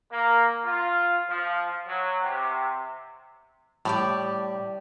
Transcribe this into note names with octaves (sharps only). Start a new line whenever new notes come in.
A#3
F4
F3
F#3
C3
A2 G3 G4 D5